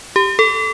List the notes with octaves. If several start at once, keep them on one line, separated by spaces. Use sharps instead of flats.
G4
A4